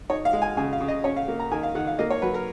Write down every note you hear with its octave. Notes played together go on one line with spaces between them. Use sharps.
D#4 C#5
F5
G#3
G#5
C#3 G#5
F5
C#3
D#5
C#4 C#5
F5
A#3
A#5
D#3 G#5
F5
D#3 F#5
F5
A#3 D#5
C#5
F#3 B4
A#4